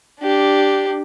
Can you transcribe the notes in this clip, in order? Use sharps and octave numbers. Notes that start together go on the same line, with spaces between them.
D4 G4